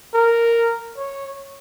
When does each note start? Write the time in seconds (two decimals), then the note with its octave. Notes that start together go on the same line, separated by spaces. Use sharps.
0.15 A#4
0.97 C#5